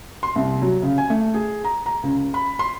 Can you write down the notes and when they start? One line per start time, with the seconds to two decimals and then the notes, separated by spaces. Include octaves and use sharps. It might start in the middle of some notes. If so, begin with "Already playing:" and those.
0.23 C6
0.36 C2
0.62 F#3
0.82 C#3
0.98 G#5
1.10 A3
1.34 G#4
1.64 A#5
1.86 A#5
2.03 C#2
2.34 B5
2.59 C6